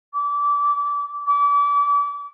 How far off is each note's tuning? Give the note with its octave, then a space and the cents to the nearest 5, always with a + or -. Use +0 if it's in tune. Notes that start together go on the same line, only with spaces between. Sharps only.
D6 -25
D6 -35